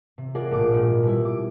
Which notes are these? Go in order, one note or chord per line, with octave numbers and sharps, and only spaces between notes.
C3
F4 G#4 A#4 D5 F#5
A#1 A2 D6
G#1 A#2 D5 D#5 F6
B2 G3 E4
D6